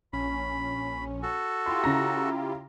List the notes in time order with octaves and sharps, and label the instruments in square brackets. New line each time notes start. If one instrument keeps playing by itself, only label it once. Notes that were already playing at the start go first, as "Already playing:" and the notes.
[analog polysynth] A#1 C#4 [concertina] B5
[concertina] F#4 A4
[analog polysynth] E4 F4 G4 [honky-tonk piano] C6
[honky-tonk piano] C#3 A#5 A#6